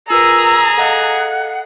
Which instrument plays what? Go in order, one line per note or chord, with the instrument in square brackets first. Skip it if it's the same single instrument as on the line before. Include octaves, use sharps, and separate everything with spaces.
[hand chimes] F4 A#4 B4 [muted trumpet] G#4 [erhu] A#5 [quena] E6
[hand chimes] A4 D#5 F5 [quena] F#5